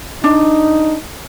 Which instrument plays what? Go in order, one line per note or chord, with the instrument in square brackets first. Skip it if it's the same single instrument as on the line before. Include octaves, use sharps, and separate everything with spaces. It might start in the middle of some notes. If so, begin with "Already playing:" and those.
[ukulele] D4 [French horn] D#4